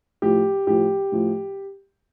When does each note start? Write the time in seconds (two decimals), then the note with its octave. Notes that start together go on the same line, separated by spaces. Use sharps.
0.22 A2 F3 G4
0.67 A2 F3 G4
1.12 A2 F3